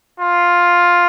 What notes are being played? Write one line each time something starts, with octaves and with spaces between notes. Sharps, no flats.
F4